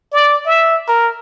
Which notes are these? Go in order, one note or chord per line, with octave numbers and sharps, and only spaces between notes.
D5
E5
A#4